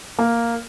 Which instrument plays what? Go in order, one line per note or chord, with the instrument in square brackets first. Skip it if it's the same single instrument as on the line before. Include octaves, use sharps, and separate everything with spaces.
[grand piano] A#3